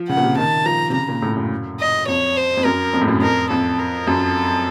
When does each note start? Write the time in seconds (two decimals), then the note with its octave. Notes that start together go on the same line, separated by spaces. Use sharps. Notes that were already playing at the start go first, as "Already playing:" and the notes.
Already playing: F3
0.08 C#3 F#5
0.17 A#2
0.23 C3
0.38 D#3 A5
0.66 F3 A#5
0.90 C3
0.94 C#3 A#5
1.08 A#2
1.22 A2
1.37 F#2
1.80 D#5
2.08 F2 C#5
2.37 C5
2.57 F2
2.65 F#2 A#4
2.93 F2
3.01 A2
3.08 F#2
3.22 F2 A#4
3.50 F2 A4
3.79 A#4
4.07 F#2 A4